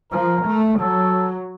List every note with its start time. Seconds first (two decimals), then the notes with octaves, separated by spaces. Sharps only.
0.12 F3 A#4
0.46 A3
0.80 F#3 A4